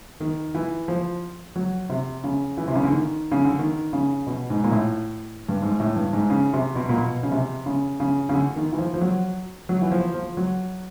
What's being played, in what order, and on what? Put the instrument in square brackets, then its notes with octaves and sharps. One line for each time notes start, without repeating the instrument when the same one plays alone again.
[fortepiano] D#3
E3
F3
F#3
C3
C#3
E3
C3
C#3
D3
D#3
C#3
D3
D#3
C#3
B2
G#2
A#2
A2
G2
G#2
A2
G2
G#2
C#3
C3
B2
A#2
B2
C#3
C3
C#3
C#3
C#3
D3
D#3
E3
F3
F3
F#3
F#3
E3
F3
F3
F#3